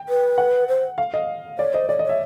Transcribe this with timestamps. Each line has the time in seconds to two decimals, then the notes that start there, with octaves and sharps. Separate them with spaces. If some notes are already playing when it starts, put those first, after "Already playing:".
Already playing: G5
0.09 B4
0.38 F#5
0.68 C5
0.98 F5
1.14 D#5
1.58 C#5 D5
1.73 C5 D#5
1.89 C#5 D5
1.99 D#5
2.04 C#5
2.09 E5